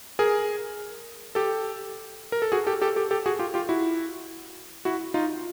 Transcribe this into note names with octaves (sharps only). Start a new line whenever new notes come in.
G#4 A#4
G4 A4
A#4
A4
F#4 G#4
G4 A4
G4 A4
G4 A4
G4 A4
F#4 G#4
F4 G4
F4 G4
E4 F#4
E4 F#4
D#4 F4